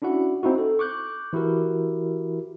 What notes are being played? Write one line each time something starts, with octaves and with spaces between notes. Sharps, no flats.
C#4 D4 E4 F#4 F#5
C4 D#4 E4 F#4
A4
C#6 D6 F#6 G6
E3 E4 F#4 G4 A#4